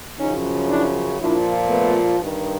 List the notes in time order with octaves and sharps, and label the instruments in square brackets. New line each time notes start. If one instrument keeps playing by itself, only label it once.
[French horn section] F#2 C#3 F3 C#4 D#4
D4 E4
A#2 F3 D4 E4
A3 B3
G2 D#3